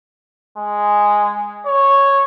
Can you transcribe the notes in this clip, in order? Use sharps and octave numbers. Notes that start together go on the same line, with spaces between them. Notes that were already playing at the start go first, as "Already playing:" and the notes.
G#3
C#5